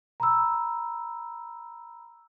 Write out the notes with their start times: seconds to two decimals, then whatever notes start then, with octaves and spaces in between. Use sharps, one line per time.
0.20 A#5 B5 E6